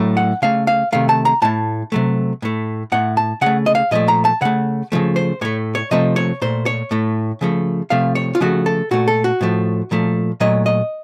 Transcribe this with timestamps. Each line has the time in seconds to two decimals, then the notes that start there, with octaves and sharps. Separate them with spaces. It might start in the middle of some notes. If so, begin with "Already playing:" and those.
Already playing: A2 F#3 A3
0.17 F#5
0.42 C#3 A3 F5
0.67 F5
0.92 C3 D#3 A3 F5
1.09 A5
1.25 A#5
1.42 A2 A3 A5
1.92 C3 F#3 A3
2.42 A2 A3
2.92 A2 A3 F#5
3.17 A5
3.41 C#3 A3 F#5
3.66 D#5
3.75 F5
3.91 A#2 F3 A3 D#5
4.08 A#5
4.25 A5
4.41 C#3 A3 F#5
4.92 C#3 F3 A3
5.16 C5
5.41 A2 A3 C#5
5.75 C#5
5.91 C3 F3 A3 D#5
6.16 C#5
6.42 A#2 A3 C5
6.66 C#5
6.91 A2 A3
7.41 C#3 F3 A3
7.90 C3 F3 A3 F5
8.15 C#5
8.35 F4
8.41 C#3 F3 A3 F#4
8.66 A4
8.91 A#2 A3 F#4
9.08 A4
9.24 F#4
9.41 A2 F3 A3
9.91 A#2 F3 A3
10.40 A#2 F#3 A3 D#5
10.66 D#5